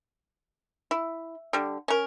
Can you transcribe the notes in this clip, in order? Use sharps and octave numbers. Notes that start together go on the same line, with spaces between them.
E4
D3 G3
C#4 A#4